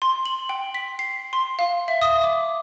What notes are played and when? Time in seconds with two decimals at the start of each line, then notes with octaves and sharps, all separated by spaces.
0.02 C6
0.26 F#7
0.49 G5
0.74 B6
0.99 C7
1.33 C6
1.59 F5
1.88 E5
2.02 D#6
2.23 D6